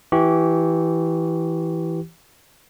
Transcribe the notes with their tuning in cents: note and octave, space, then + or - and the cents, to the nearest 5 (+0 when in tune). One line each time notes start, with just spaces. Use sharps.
E3 +0 G4 -20 C#6 +0